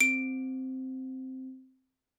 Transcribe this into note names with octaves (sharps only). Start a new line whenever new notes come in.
C4 D7